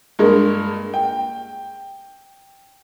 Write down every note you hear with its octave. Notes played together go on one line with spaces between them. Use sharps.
G2 G#3 A#3 G#4
G5